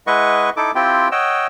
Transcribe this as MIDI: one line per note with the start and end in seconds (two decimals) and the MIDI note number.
0.07 0.50 56
0.07 0.50 64
0.07 0.50 71
0.07 0.50 75
0.07 0.50 78
0.07 0.50 85
0.57 0.71 63
0.57 0.71 64
0.57 0.71 69
0.57 0.71 86
0.75 1.08 60
0.75 1.08 64
0.75 1.08 65
0.75 1.08 67
0.75 1.08 79
1.12 1.47 73
1.12 1.47 75
1.12 1.47 78
1.12 1.47 79
1.12 1.47 88